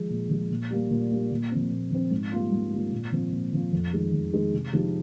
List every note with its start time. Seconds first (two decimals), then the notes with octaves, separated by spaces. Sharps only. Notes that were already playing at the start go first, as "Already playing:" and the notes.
Already playing: F3 G#3
0.10 A#2
0.30 F3 G#3
0.51 A#2
0.71 G3 A#3
0.91 A#2
1.10 G3 A#3
1.31 A#2
1.52 F3 C4
1.71 A#2
1.91 F3 C4
2.11 G#2
2.32 G3 A#3 F4
2.52 G#2
2.72 G3 A#3 F4
2.92 A#2
3.12 F3 C4 F4
3.32 A#2
3.53 F3 C4 F4
3.72 F2
3.93 D#3 G#3
4.13 F2
4.33 D#3 G#3
4.53 C3
4.73 F3 G#3 D#4 G4